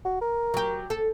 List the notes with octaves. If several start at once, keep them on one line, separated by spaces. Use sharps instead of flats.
F#4
A#4
F#3 G4
A4